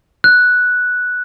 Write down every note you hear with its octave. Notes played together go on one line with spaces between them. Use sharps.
F#6